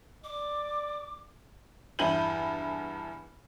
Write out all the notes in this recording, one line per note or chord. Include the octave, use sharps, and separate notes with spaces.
D5 D6
E2 G2 E4 G6 D#7 F#7